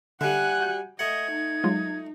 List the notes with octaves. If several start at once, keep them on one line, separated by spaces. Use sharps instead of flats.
D3 G3 E5 F#5 G#5 F#6
F#4 G6
A3 D#5 F#5 G#6
D#4
F#3 G#3 F4